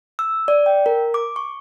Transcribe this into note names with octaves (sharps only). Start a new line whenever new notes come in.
E6
D5
G5
A#4
D6
C#6